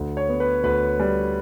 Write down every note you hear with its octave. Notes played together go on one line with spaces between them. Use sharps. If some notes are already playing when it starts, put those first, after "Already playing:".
Already playing: D2
C#5
B3
B4
D2 B4
G3